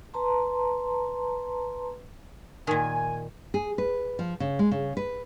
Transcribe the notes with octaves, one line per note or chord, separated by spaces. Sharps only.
B4 A5 A#5 C6
A#2 D#3 G#5
G#4
B4
F3
C#3
G#3
C#3
B4